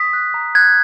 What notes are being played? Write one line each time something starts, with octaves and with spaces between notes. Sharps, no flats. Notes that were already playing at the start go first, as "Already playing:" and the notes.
Already playing: D#6 B6
F#6
A#5
F#6 G#6